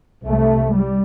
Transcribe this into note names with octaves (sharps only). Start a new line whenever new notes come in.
C2 C3 A3
G3